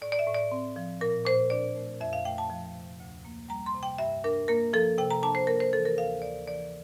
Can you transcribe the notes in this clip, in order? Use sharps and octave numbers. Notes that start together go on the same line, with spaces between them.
A2 D5
D5
E5
A2
D5
C4
F3
A#2 A#4
A#2 C5
D4 D5
A3
F2 E5
F5
A3 G5
A5
F3
C3
D2
A#3
G3 A#5
C6
C3
G5
G2 E5
D4 A#4
A#3 A#4
F3 A4
C3 G5
A#5
D4 A5
C5
A#3 A#4
C5
E3 A4
A#4
D2 F5
D2 D5
E3 D5